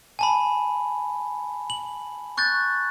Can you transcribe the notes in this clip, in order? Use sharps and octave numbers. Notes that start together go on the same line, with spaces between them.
G#5 A5 B5
F#7
C#6 F#6 G6 A6